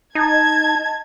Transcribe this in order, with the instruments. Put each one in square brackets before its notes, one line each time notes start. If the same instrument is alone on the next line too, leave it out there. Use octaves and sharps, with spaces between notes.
[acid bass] D#4 [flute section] D#5 A5 [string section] G#6